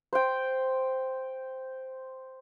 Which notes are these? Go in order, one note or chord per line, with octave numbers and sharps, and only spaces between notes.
C5 G5